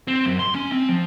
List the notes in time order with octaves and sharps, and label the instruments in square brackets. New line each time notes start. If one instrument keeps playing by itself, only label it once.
[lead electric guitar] C4
F#2
C6
C#4
C4
F3